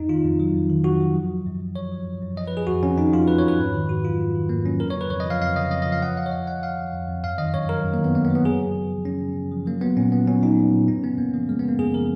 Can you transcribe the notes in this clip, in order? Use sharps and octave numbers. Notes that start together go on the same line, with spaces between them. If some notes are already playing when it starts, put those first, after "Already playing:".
Already playing: F2 D#4
D#3 F4
F2
F#3
F2
D#3
F2 F#4
F#3
F3
F3
F#2
F#2
F3 C#5
F3
F#2
F#2
F3 D#5
B4
F3 G#4
F2 F#4
F2 C#4
F3 D#4
F3 F4
F2 B4
C#5
F2
B4
G#2
D#3
G#2 F#4
F#3 F4
G#2
D#3
G#2 A#3
F#3 C#4
F2 A#4
C#5
C#3 B4
F2 C#5
D#5
F3 F5
F2 F5
C#3 D#5
F2 D#5
D#5
F3
F5
F3 F#5
F3 F5
C#5
F2 D#5
F2 F#5
F3 F5
F3
F2
F2
F#2 F5
D#3 D#5
F#2 C#5
F#3 A#4
F#2
A#3
D#3
B3
F#2 A#3
B3
F#3
B3
F#2 G#4
C#3
F#2
F3
F#2 C#4
C#3
F#2
F3
F#3 A#3
F#3 B3
A#2 C#4
A#2 B3
F#3 C#4
F#3 D#4
A#2
A#2
F#2 C#4
C#3 B3
F#2 A#3
F3 A#3
F#2 G#3
B3
C#3 A#3
F#2 G#4
F3 A#4